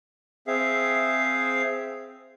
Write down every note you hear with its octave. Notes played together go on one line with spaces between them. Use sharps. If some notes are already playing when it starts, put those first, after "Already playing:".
C4 G#4 E5 F5